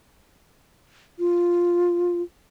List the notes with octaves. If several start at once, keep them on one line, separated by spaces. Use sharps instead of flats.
F4